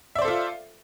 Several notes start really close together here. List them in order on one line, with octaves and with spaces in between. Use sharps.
E5 D5 C5 A4 F4